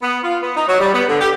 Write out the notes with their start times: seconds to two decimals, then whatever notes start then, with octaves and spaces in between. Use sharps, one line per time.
0.02 B3
0.23 F4
0.42 B3
0.56 D#4
0.67 F#3
0.79 G3
0.94 B3
1.08 D3
1.21 G4